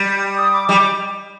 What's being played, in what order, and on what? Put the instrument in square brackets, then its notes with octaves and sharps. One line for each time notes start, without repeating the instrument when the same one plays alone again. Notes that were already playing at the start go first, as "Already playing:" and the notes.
Already playing: [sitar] G3
[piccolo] D#6
D6
[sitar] G3 [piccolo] D6